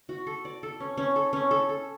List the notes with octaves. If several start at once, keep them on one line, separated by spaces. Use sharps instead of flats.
F#4
A4
D5
A4
C#4
C#4
A4
C#4
A4
A4